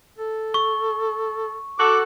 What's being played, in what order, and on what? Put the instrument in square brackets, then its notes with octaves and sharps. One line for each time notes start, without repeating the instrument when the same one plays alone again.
[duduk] A4
[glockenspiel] C#6
[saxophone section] F#4 A4 [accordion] D6